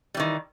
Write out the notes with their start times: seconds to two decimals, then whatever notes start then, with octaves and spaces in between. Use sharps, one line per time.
0.14 G3
0.17 E3
0.20 D#3